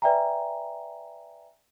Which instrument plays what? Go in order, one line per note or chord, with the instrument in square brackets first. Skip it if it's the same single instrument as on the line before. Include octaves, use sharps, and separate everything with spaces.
[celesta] B4 D5 E5 G5 G#5 A#5